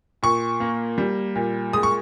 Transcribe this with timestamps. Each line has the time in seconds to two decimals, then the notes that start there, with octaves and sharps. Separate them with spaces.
0.23 A#2 C#6
0.60 A#3
0.98 G3
1.35 A#2
1.73 G#3 D#6
1.83 C#6